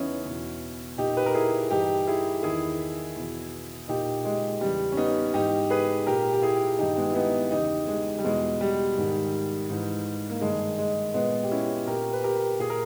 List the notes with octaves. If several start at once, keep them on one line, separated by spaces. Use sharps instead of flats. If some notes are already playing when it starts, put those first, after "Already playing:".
Already playing: E2 C#3 E3 B3 C#4 D#4 E4
E2 B2
A#2 D#4 G4
B4
A#4
E4 G#4
G2 E3 D#4 G4
E4 G#4
E2 D#3 E4 G#4
E2 B2
A#2 D#4 G4
G#3
E2 C#3 E3 G3
C#4
B3 D#4
G#2 E3 D#4 G4
G#4 B4
A#2 G4 A#4
G4
E4 G#4
G2 D#3 D#4 G4
G#3 B3
E4
B3 D#4
E2 C#3 E3 D#4 G4
G#3
G3
E2 B2 G#3
G3
G#2 D#3
G#2 E3
A#3
G2 D#3 G#3
G#3
A#2 G#3 B3
G4
C#4 E4
A#2 G4 A#4
B4
G4 A#4
A#2 G#4
A#4